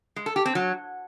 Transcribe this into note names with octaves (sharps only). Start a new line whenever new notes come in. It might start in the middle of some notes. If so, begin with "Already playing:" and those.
G#3
A4
G4
C4
F#3